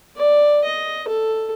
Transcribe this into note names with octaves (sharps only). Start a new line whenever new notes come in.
D5
D#5
A4